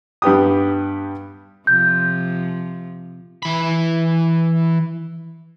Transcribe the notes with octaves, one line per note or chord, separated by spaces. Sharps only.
G2 B3 G4 D#6
C3 F3 G6
E3 B5